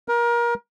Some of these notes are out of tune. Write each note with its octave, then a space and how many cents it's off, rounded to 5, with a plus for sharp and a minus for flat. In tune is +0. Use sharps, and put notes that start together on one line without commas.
A#4 +25